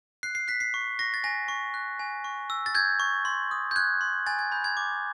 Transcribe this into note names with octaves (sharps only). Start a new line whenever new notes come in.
F#6 C7
C7
F#6 B6
C7
C#6
C#6 A#6
A6
G#5 A#6
C#6
F#6
G#5
C#6
E6
A6
G6 G#6
C#6
C6
D#6
G6
F#6 G#6
C6
G#5 A6
G#6
B5 G6
G#6
D6